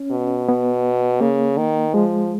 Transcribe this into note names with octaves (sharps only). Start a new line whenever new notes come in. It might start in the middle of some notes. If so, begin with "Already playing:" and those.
Already playing: C#4
B2
B3
C#3 A#3
D#3
F3 G#3